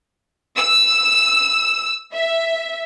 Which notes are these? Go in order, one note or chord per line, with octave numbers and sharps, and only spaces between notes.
E6
E5